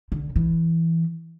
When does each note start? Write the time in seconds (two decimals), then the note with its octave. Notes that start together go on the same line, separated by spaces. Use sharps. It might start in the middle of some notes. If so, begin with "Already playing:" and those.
0.12 D3
0.36 E3